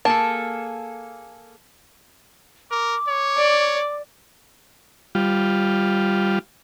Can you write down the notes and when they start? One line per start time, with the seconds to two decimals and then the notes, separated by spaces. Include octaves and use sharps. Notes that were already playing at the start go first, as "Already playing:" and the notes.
0.05 A#3 G#4 A4 A5
2.71 A#4 D6
3.08 C#5
3.37 D5
5.15 G3 F4